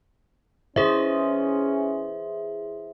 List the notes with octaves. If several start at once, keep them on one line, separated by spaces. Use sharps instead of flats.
E3 C#4 G#4 C5 D#5 E5